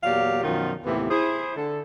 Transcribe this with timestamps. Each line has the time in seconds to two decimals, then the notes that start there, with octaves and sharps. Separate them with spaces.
0.04 E2 A#2 F#3 G4 D5 F5
0.43 F#2 B2 D#3 F3 F4
0.84 D#2 A2 C3 E3 B3
1.09 E4 G#4 C5
1.56 D3 A4